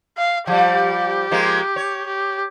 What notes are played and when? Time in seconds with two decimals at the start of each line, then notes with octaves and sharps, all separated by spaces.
0.18 F5
0.47 F3 G3 G4
1.31 F3 G#3 A#3
1.76 C#5
2.07 G4